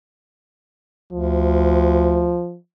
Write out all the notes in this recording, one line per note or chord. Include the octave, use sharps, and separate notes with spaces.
D2 F3